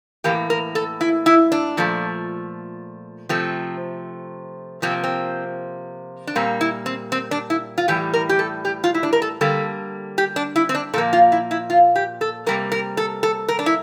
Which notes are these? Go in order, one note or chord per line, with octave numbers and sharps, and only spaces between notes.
A2 E3 A#3 G4
A#4
A4
E4
E4
D4
A#2 F3 A3
C3 F3 A3 C4
C3 F3 A#3 C4
C4
D4
A#2 G3 A#3 C4
E4
C4
C4
D4
E4
F4
A2 E3 G3 G4
A#4
G4
A4
G4
F4
E4
D4
A#4
A4
D3 G3 A#3 A4
G4
D4
E4
C4
D4
A#2 F3 A#3 A4
F4
E4
E4
F4
G4
A4
C3 G3 A#3 A#4
A#4
A4
A4
A#4
D4
E4